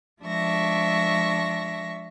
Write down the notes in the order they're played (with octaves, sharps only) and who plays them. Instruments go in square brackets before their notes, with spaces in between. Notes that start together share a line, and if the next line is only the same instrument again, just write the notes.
[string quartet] F3 G#3 D4 E5 C#6 A#6